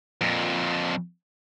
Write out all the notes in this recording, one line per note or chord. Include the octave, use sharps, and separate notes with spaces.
F2 A#2